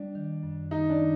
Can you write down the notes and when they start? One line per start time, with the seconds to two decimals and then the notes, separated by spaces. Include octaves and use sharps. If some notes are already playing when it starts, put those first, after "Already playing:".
Already playing: G3 D4
0.15 D#3
0.43 F#2
0.71 D#3 D#4
0.90 D4
0.99 D#3